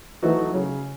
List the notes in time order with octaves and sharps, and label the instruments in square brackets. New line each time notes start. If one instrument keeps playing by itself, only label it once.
[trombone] E3 [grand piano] F#3 A3 D#4 F#4
[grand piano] C#3 [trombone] F#3